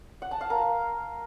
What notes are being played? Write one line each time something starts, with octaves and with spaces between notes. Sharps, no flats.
F#5
A5
F5
A#4